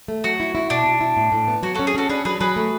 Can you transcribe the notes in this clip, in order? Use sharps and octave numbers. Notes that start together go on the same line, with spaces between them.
A3
F#3 F#4
E4
E4
B2 D4
B2
E4
A2
A2
B3
F#3 F#4
C#4 F#4 A4
G#4
C#4 F#4 A4
D4 G#4 B4
F#3 G#4 B4
F#3 G#4 B4
A3